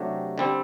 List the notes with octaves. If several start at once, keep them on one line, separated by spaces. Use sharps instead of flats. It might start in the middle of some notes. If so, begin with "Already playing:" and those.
Already playing: C3 F#3 A3 D4 G4
D3 G3 C4